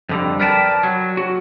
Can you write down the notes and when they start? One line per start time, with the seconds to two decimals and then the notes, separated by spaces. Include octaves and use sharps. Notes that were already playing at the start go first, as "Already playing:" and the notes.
0.09 F2 D3 G3
0.40 A#4 B4 D5 G5 A5
0.83 F#3
1.17 F#4